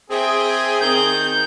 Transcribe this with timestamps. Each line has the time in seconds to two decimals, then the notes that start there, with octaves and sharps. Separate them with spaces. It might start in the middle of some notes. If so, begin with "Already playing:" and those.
0.10 C4 G#4 E5 G5
0.81 D#3 C4 G6